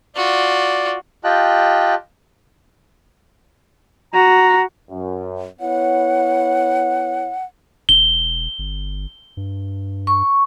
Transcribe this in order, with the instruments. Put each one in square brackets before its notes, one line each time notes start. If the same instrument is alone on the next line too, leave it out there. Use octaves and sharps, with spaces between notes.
[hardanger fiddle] F4 F#4 [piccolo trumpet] D5
[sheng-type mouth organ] F4 G4 D#5 G5 A5 F#6
[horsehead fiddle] F#4 [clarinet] A#5
[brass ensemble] F#2
[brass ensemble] B3 E4 C#5 [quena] F#5
[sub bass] E1 [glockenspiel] G7
[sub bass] G1
G2
[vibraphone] C#6